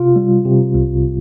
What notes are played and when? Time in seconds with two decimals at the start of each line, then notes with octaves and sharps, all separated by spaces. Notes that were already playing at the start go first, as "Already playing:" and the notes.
Already playing: C3 F4
0.16 G3
0.45 C3
0.74 C2